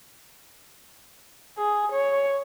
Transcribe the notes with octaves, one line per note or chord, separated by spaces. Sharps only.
G#4
C#5